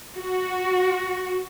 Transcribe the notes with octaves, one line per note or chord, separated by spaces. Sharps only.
F#4